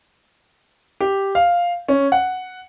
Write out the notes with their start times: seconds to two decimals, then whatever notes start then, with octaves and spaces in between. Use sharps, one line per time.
1.00 G4
1.35 F5
1.88 C#4
2.12 F#5